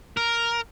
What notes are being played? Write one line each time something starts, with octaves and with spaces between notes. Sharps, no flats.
A#4